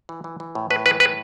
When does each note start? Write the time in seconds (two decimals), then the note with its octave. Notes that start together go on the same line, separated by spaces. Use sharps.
0.09 E3
0.24 E3
0.40 E3
0.55 A2
0.70 A2 B4
0.85 E3 B4
1.00 A2 B4